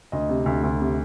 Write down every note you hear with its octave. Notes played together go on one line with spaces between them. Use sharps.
D2 D#5
C3
D2
D2
C3